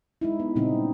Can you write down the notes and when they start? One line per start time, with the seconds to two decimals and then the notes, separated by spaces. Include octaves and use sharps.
0.21 G#3 D#4 E4
0.40 B3
0.55 A#2 C#3 G3 C4 D#4